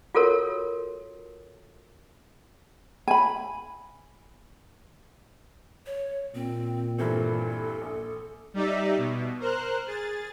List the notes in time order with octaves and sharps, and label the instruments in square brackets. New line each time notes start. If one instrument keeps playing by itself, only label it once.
[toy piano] F4 F#4 A4 A#4 C#5
[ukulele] G#5 B5
[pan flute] C#5
[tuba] A#2 [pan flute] C4
[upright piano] G2 E3 C4 [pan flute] A4
[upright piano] A#1
[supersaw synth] G3 D#4 D5 E5
B2
A#4 C5 F6 F#6
G#4 A6